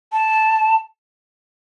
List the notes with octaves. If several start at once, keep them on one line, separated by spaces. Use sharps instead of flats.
A5